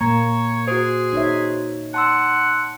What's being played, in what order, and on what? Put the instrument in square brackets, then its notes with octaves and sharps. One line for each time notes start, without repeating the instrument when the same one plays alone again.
[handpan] A#2 A#3 [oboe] C#5 [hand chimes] A#5
[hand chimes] F#4 C5 [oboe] G#4
[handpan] D#4 C#5 E5
[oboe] F#5 [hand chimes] A5 C6 E6